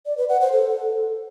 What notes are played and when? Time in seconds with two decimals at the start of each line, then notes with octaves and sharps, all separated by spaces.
0.06 D5
0.17 B4
0.29 F#5
0.41 C5
0.52 A4